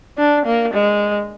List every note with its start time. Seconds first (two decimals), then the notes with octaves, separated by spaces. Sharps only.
0.18 D4
0.45 A#3
0.74 G#3